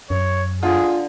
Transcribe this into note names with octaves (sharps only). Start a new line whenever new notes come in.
F#2 C#5
D3 F4 G#4